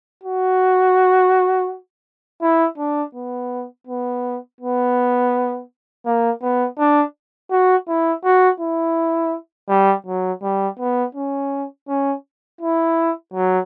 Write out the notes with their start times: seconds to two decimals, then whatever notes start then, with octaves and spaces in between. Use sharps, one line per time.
0.24 F#4
2.42 E4
2.78 D4
3.15 B3
3.87 B3
4.61 B3
6.06 A#3
6.42 B3
6.79 D4
7.51 F#4
7.88 E4
8.24 F#4
8.60 E4
9.69 G3
10.07 F#3
10.43 G3
10.79 B3
11.15 C#4
11.88 C#4
12.61 E4
13.34 F#3